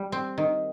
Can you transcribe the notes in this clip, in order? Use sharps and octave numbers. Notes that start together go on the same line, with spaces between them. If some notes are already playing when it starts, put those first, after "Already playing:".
Already playing: G3
C4
D#3